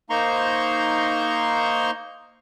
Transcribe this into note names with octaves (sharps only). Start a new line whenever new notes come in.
A#3 D#4 C5 A#5 C6 C#6